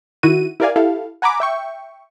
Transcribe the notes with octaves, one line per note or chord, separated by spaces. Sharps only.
D#3 E4 F#4 D#7
E4 G4 A#4 D5 F5 G#5
E4 G4 A4 F5
F#5 G#5 A#5 B5 D6
E5 G5 C#6